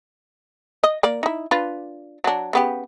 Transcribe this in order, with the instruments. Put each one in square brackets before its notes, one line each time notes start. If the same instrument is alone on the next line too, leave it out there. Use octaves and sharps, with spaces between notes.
[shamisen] D#5
A#3 D5
D#4 E4
D4 F4 B4
F#3 D4
C#3 B3 G4